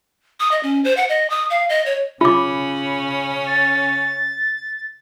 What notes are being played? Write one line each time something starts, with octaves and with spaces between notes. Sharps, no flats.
D#6
D#5
C#4
C5
F#5
D#5
D#6
F5
D#5
C#5
C#3 C#4 F4 B5 D6
A6